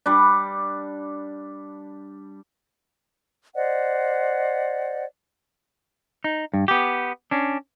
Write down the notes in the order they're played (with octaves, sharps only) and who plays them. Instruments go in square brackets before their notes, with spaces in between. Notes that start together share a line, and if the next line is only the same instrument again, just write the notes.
[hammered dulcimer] G3 D4
[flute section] C5 D5 D#5 F#5
[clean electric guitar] D#4
G2
B3 G4
C#4 D4